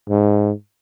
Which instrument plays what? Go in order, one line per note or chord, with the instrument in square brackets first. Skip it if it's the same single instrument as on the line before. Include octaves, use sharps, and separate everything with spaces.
[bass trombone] G#2